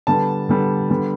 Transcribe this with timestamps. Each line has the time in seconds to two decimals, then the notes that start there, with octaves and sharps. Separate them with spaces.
0.07 D3 G3 B3 A5
0.49 D3 G3 B3
0.89 D3 G3 B3